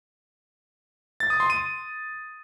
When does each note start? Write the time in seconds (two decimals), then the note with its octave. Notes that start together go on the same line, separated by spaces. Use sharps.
1.20 A6
1.30 D#6
1.40 C6
1.50 D#7